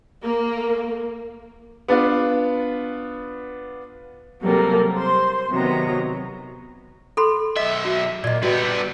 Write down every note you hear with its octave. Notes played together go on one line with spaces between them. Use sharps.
A#3
B3 D4 F4
C3 F#3 G3 A#3 A4
C5 C6
C3 D#3 F#3 B3 A#5
A4 B5 C6
B1 D#5 E5
F#4
A#2 D5 D#5
G3 B3 F#4